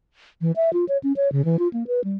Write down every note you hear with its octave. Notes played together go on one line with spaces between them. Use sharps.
E3
E5
F4
C#5
C#4
C#5
C#3
E3
F4
A#3
B4
G3